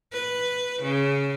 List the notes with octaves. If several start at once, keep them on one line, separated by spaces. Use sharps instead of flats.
B4
C#3